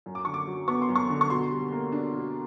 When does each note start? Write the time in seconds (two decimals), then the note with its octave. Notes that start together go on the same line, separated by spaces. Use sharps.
0.06 F#2
0.15 D6
0.25 D3 C#6
0.34 D6
0.47 F#3
0.68 B3 C#6
0.82 C6
0.89 F#2
0.95 C#6
1.10 D3
1.21 C#6
1.30 B2 C6
1.51 G3
1.72 A#3
1.92 D4
2.13 B2